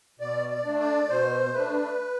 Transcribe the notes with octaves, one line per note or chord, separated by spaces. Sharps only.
B2 D5
D5
A3 D4
D5
B2 C5
A3 D4 B4